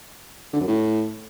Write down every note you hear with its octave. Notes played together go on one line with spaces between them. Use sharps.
D3
F#2
A2